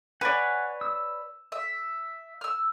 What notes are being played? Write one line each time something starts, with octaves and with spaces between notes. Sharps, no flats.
B4 C#5 D5 F#5 G#5
E6
E5
E6 F6